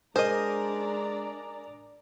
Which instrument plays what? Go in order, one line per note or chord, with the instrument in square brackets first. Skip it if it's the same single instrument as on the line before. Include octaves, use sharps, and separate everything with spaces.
[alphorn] G#3 [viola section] D4 D5 A#5 [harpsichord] G#4 A#4 [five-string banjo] C5 D#5